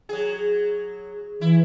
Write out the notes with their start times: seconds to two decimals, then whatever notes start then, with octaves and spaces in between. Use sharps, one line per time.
0.09 F#3 G#4
1.41 E3 E4